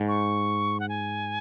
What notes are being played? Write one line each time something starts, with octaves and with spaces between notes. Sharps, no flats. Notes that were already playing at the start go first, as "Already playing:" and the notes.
Already playing: G#2
C#6
F#5
G#5